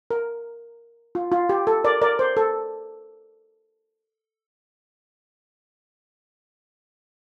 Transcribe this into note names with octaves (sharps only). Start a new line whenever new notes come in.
A#4
F4
F4
G4
A4
A#4 D5
A#4 D5
C5
A4